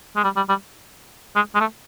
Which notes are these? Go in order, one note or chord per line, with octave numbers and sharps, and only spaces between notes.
G#3
G3
G3
G3
G#3
G#3
A3